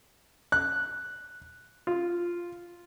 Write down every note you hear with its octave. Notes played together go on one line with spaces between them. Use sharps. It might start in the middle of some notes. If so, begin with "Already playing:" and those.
F#6
F4